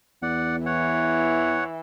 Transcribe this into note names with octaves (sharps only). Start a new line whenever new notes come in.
E2 D5 F#5
E3 C#5 F#5